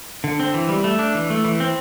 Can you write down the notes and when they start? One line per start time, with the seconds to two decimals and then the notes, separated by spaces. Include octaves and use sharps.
0.24 D3
0.40 C4
0.54 E3
0.69 G3
0.84 A3
0.99 D4
1.15 E3
1.30 A3
1.45 E3
1.60 C4